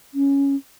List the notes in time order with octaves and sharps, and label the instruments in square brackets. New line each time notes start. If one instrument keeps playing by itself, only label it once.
[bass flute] C#4